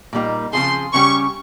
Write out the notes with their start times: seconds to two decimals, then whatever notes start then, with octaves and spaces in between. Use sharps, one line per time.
0.13 A#2 G3 A#3 D#4
0.53 C#3 F3 C4 F4 G#4 C6
0.93 C#3 G3 C#4 G4 C#6